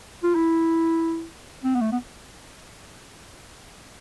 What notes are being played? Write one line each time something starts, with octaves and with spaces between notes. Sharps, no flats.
F4
E4
C4
B3
A3
B3